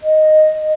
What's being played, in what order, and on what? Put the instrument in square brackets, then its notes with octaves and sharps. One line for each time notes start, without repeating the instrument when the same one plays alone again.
[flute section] D#5